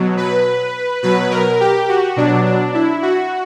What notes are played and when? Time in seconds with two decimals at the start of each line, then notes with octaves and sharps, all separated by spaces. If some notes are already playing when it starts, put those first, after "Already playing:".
Already playing: B2 F#3
0.17 B4
1.03 B2 F#3 B4
1.31 A#4
1.60 G4
1.89 F#4
2.16 B2 F#3 D4
2.45 D4
2.74 E4
3.02 F#4